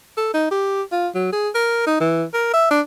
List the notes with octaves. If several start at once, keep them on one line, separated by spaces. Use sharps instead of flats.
A4
D#4
G4
F4
F#3
G#4
A#4
D#4
E3
A#4
E5
D4